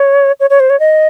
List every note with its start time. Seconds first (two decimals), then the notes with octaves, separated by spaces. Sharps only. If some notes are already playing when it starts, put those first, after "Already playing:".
Already playing: C#5
0.40 C#5
0.50 C#5
0.60 C5
0.70 C#5
0.80 D#5